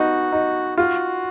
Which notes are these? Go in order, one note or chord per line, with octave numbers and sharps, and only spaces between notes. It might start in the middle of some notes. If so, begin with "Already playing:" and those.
Already playing: B3 D#4 F#4
D#4
F4 F#4